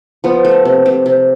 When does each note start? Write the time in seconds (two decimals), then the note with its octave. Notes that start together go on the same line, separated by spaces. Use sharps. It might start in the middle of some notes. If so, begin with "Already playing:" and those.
0.24 F3 B3
0.45 A3
0.65 C3
0.86 C3
1.06 C3